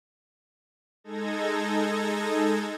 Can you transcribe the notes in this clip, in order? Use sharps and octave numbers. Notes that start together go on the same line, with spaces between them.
G#3 D#4 A4 G#6 A#6